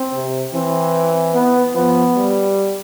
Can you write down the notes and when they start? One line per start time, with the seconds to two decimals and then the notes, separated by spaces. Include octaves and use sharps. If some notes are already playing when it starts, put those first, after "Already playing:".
Already playing: C4
0.14 C3
0.54 E3 C4
1.35 B3
1.75 F3 B3
2.16 G3